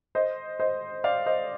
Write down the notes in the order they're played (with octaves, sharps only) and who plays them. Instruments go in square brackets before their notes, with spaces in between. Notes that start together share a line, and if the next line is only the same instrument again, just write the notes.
[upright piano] C5 D#5
C5 D#5
D5 F5
C5 D#5